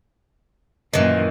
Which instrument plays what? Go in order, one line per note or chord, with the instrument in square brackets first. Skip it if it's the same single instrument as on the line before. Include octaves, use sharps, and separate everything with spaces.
[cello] F#2 A#2 [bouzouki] D#3 E3